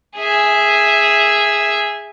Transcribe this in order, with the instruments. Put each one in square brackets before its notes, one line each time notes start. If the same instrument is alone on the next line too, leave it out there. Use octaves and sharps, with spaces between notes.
[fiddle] G#4 E5